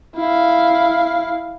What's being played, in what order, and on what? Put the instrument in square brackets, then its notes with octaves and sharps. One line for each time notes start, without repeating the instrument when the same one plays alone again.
[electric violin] E4 F5